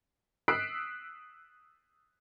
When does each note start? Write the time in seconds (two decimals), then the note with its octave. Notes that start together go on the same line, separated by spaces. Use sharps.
0.48 D#6 E6 F#6 B6 C7 D7